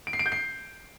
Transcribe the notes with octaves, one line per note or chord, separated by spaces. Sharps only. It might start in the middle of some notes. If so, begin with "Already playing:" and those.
D7
C7
D7
G6
C7